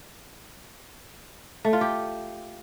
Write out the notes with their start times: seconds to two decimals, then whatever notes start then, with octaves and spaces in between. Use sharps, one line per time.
1.65 A3
1.73 F4
1.81 G4